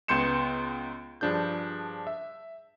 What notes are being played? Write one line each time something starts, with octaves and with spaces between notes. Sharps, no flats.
C#2 B3 C6 G6 C#7 E7
G2 F3 D4 G#4 G6
E5